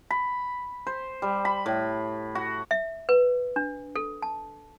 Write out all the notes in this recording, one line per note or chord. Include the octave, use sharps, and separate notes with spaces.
B5
C5
G3
B5
A2
F#4
E5
B4
D4
A4
A5